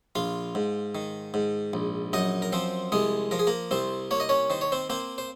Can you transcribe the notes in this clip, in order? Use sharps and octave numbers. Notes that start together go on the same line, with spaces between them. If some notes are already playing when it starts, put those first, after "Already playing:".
A#1 F4 F5
G#2
D#3
G#2
A#1
F#2 D#4 D#5
A#4
F3 C4 C5
C2 G#3 G#4
F3 A#4
G#4
A#3 A#4
C2 C4 C5
A#3 C#5
D#5
C#4 C#5
D#3 C5
C#5
C4 C5
A#3 C4 C5
C5